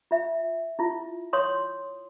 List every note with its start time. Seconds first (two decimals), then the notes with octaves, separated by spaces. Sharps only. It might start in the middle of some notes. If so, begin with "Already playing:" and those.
0.11 F4 E5
0.79 E4 F4
1.33 C#5 C6 D#6